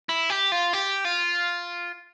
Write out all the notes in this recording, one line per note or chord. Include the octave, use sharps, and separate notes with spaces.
E4
G4
F4
G4
F4